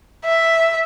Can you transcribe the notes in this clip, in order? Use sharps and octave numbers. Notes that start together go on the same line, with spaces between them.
E5